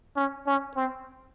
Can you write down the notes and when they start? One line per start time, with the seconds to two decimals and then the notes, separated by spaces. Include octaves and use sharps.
0.16 C#4
0.47 C#4
0.76 C4